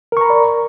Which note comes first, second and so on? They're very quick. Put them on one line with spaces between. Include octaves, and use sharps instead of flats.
A#4 C#6 A#5 B5 D5